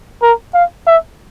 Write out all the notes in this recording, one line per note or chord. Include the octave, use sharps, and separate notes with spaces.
A#4
F5
E5